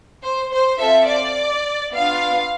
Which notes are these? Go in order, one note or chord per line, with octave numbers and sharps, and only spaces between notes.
C5
C5
C4 F4 A4 E5
D5
B3 D4 F4 F5